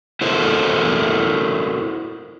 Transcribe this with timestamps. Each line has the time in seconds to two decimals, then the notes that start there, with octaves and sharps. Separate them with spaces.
0.21 E4 F#4 A4 A#4 C5